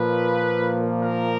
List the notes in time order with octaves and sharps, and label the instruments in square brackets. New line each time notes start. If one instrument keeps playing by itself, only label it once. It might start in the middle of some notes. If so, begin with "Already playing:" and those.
Already playing: [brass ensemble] A#2 F3 A#3 B4
A#4